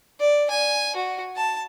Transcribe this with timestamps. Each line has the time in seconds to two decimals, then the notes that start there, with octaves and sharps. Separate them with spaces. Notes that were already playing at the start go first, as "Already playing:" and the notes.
0.20 D5
0.50 G#5
0.96 F#4
1.36 A5